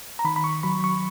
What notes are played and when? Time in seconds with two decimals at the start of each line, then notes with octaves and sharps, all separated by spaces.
0.19 A#5
0.25 D#3 B5
0.36 B5
0.44 C#6
0.63 F#3 B5
0.84 C#6